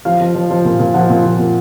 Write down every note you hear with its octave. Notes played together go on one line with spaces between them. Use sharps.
F3 F5
F3
F3
F3
A#2
A#2
F3 F#5
A#2
F3
A#2